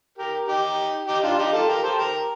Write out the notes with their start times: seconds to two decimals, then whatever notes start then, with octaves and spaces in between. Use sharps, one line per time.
0.18 G4 A#4
0.48 D#4 G4
1.08 D#4 G4
1.23 D4 F4
1.38 D#4 G4
1.53 F4 A4
1.68 G4 A#4
1.83 A4 C5
1.98 G4 A#4